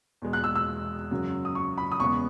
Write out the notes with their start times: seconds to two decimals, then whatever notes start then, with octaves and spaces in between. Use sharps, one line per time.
0.22 E2 B2 G#3
0.33 F#6
0.44 E6
0.55 E6
1.11 F#2 C#3 F#3
1.45 D#6
1.55 C#6
1.78 B5
1.92 D#6
2.00 E2 C#3 G#3 B3 C#6